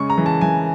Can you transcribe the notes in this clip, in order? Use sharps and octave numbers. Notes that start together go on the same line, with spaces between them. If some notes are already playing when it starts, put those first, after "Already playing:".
Already playing: C#3 G#3 C#6
A#5
E3
A5
E3 G#5